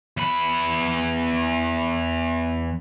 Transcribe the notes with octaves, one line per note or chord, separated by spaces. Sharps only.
E2 B5